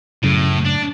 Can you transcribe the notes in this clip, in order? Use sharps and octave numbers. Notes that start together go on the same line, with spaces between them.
F#2 A2 C#3
D4